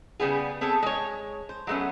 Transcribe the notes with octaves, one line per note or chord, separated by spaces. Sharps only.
C#3 G3 B3 G#4
B3 C4 G#4 A4
G#3 C#5
C5
F#3 G#3 A3 B3 C#4